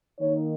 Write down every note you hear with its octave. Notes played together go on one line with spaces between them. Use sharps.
D#3 A#3 D#4 C#5